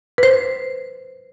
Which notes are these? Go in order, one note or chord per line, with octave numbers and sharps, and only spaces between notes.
B4
C5